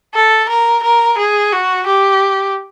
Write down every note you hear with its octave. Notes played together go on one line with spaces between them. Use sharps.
A4
A#4
A#4
G#4
F#4
G4